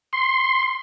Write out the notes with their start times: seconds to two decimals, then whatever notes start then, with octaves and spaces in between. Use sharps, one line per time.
0.13 C6